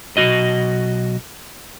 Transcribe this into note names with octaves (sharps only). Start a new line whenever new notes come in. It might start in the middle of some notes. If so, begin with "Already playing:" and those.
B1 C3 F#4 D#5